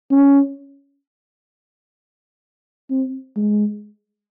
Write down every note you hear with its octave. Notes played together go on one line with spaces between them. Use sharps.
C#4
C4
G#3